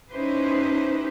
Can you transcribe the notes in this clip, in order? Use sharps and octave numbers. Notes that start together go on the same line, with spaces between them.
C#4 D#4 E4 G4 B4 C5